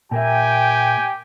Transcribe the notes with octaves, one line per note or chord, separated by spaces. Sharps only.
A#2 G4 A#4 E5 G5 G#5